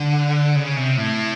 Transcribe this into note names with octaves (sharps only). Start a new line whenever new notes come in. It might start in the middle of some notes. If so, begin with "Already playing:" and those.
Already playing: D3
C#3
C3
A2